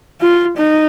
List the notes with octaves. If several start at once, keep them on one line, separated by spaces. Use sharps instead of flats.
F4
D#4